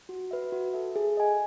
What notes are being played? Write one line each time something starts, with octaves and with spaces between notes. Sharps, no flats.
F#4
B4 E5
F#4
A4 E5
G#4
D#5 G#5